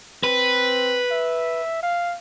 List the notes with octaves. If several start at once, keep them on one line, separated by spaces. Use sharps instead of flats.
C4 B4
E5
F5